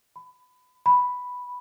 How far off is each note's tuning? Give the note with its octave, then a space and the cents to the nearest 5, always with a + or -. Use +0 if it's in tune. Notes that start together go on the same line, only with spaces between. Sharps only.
B5 +25
B5 +0